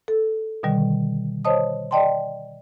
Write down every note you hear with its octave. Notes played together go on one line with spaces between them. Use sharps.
A4
B2 D3 D#3 G3
C5 C#5 D#5 A5 D#6
D5 D#5 G5 A5 C6